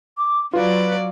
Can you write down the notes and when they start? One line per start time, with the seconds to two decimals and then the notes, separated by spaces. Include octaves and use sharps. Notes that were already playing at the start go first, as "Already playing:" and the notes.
0.18 D6
0.53 F#3 F4 B4 D5